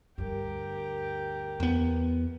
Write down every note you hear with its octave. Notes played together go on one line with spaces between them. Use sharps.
D2 G2 G4 A#4
E2 B3